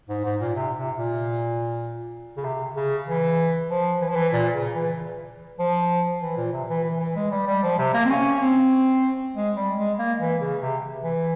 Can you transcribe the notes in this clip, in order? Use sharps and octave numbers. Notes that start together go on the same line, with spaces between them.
G#2
G#2
A#2
C3
C3
A#2
C#3
C3
C#3
E3
F3
E3
F3
E3
A#2
C#3
E3
F3
E3
A#2
C3
E3
E3
E3
G#3
G3
G3
F3
C3
A#3
C4
C#4
C4
G#3
G3
G#3
A#3
E3
C#3
C3
E3